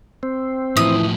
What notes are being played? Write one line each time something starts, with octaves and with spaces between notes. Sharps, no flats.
C4
A2 E3 F3 D#6